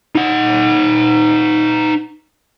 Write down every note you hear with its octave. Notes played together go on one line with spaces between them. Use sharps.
D#4 F#5